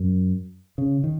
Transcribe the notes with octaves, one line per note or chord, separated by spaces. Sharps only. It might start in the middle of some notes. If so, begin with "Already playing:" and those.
Already playing: F#2
C#3
D#3